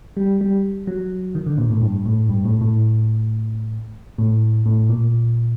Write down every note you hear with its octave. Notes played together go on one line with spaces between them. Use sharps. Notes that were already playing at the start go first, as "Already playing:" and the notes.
G3
G3
F#3
D#3
D3
A#2
A2
G2
A2
G2
A2
A2
A2
A2
A#2